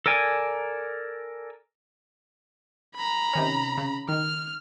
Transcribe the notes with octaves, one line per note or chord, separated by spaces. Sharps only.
A4 A#4 D5 G#5
A#5 B5
C3 D#3 C#4
C#3
D#3 F6